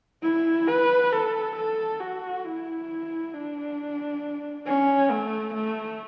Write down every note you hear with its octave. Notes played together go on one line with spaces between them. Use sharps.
E4
B4
A4
A4
F#4
E4
D4
C#4
A3
A3